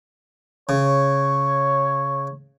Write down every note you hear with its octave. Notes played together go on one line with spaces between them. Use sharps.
C#3 C#5